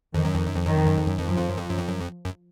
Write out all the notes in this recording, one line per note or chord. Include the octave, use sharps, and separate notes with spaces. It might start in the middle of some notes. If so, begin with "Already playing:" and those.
F2 D#3
F#2
F2
F#2
F2
F#2 D#3
F2
F#2
F2
F#2
F2 F3
F#2
F2
F#2
F2
F#2
F2
F#2
F2
F#2